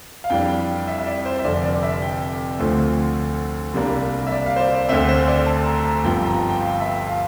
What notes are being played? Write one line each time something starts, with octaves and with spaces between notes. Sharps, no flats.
F5
F2 E3 G3 D4 G5
E5
E5
D5
C5
E5
F1 F2 D3 D5
D5
E5
G5
D2 D3 F3 A3 C4 C5
C2 C3 G3 A#3 D4
E5
D5
F5
C5
D5
D5
D2 D3 A3 C4 E5
C5
C5
D5
A5
A#5
A#5
G1 G2 F3 C4 G5
A#5
A5
G5
F5
E5
F5